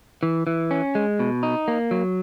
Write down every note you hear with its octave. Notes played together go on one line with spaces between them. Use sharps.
E3
E3
C#4
G#3
B2
D#4
A#3
F#3